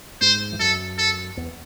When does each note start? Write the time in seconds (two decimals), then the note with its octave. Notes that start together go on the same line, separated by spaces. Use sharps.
0.21 G#2 C5
0.52 E2
0.59 F#2 A4
0.99 A4
1.37 E2